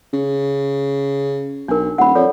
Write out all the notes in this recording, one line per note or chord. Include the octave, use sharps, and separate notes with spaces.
C#3
B1 D4 A#4
D#1 F#5 B5
F2 A4 C#5 D5